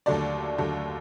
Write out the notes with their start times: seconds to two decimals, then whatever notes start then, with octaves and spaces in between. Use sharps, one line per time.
0.06 D#2 D3 F#3 A3 D5
0.58 D#2 D3 F#3 A3